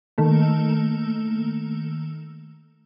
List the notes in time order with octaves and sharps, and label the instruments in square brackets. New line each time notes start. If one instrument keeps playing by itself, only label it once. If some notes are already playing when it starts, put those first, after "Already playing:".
[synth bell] D#3 A3 A#3